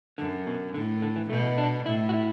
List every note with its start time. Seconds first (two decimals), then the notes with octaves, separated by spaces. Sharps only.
0.18 F#2 D3
0.47 B2
0.74 A2 D3
1.02 D3
1.16 E3
1.29 B2 A3
1.58 D4
1.86 A2 E4
2.09 F#4
2.14 E4